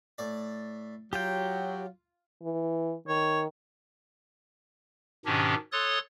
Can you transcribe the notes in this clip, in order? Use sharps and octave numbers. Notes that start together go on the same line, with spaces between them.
A2 D5
F#3 F4 G4 G5
E3
D#3 C#5
G#2 B2 D#3 C#4 D4 G4
A4 C#5 C6 D#6 F#6 A6